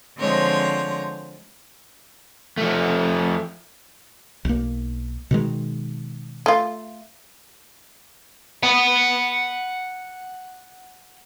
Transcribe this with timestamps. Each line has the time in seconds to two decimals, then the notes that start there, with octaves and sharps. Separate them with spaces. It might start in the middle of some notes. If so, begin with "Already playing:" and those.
0.19 D3 F3 G#3 C4 C#5 A#5
2.58 F3 A3
4.45 B1 A#3
5.31 B2 D#3 G#3
6.46 A3 F4
8.63 F#5 B5